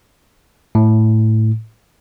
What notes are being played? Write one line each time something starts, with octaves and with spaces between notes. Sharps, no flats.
A2